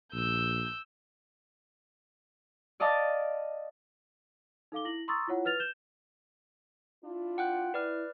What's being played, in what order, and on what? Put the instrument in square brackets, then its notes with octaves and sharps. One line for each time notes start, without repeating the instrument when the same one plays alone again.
[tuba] A#1 [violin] E6 G6
[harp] D5 D#5 F5 A5 D6 D#6
[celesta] D#4 A4 F5 D6 G7
E4 A#6 F#7
A#5 C6 C#6 D#6 E6 A6
E4 F4 C#5 F#5
B4 F6 A6 F7
G6 E7 G7
[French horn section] D4 E4 F4
[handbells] F#5 G5 F#6
[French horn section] E4 [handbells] B4 D5 F6